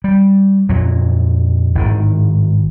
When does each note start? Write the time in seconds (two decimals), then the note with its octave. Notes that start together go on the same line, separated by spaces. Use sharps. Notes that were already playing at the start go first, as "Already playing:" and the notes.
0.04 G3
0.69 F2 A#2 F#3
1.75 G#1 A2 D#3